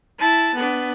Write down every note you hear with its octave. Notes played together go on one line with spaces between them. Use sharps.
E4 A5
B3 D4